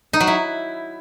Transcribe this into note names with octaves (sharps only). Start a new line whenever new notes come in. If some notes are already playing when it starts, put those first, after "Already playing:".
D#4
F#3
E4